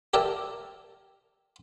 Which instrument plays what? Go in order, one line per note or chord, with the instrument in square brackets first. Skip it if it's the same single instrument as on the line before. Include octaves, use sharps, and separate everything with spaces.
[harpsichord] G4 A#4 D5 E5 G5 A5